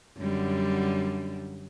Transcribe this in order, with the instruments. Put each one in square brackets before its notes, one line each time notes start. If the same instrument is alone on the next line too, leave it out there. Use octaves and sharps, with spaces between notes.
[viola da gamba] F#2 D3 G3